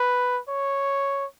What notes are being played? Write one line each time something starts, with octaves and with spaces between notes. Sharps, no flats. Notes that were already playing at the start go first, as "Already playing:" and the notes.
Already playing: B4
C#5